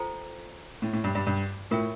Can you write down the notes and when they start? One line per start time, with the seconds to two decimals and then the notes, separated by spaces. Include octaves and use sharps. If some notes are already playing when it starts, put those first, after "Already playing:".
Already playing: F4 A4 C5 G5 A#5
0.82 A2
0.93 A2
1.04 G2
1.15 G2
1.27 G2
1.71 A2 F4 A#4 E5 G5